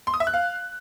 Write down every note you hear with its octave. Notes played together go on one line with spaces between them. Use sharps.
C6
D#6
E5
F#6
F5